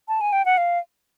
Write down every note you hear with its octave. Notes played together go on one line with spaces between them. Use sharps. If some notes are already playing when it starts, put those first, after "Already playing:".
A5
G#5
G5
F#5
F5